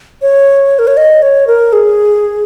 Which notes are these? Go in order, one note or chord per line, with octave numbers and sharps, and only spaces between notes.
C#5
A#4
C#5
D#5
C#5
A#4
G#4